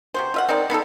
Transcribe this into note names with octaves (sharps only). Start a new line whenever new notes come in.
C3 F#4 C5
F4 E5 F#5
C4 D#4 A#4 D5
B3 D#4 F#4 A4